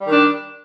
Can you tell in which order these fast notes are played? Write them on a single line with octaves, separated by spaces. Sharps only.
G3 D#3 D4